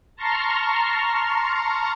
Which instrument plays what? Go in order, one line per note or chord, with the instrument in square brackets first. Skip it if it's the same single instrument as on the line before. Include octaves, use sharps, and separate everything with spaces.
[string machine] A5 A#5 C6 C#6 F6